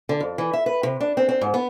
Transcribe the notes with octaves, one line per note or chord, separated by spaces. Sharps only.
D3
F2
E3
E5
B4
C3
D4
C4
C4
G#2
B3